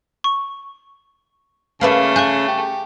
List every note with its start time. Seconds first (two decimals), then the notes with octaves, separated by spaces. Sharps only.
0.24 C#6
1.81 C#3 A3 A#3 B4 E5
2.16 G#4 C#6 F#6 G6
2.48 G4